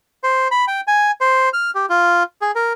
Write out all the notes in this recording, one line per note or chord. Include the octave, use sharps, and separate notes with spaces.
C5
B5
G5
G#5
C5
F6
G4
F4
G#4
A#4